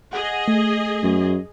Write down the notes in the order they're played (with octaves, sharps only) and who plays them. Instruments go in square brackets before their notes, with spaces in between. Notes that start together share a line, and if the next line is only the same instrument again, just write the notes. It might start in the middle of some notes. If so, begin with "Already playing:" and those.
[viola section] G#4 D#5 [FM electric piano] F#5
[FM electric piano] A3
[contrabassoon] F#2